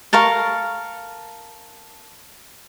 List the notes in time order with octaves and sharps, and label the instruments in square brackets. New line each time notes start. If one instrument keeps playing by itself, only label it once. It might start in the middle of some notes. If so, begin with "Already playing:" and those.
[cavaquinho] A4 A#4 F5 C#6